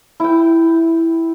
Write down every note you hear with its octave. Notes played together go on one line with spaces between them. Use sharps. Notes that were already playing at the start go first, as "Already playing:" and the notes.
E4 G5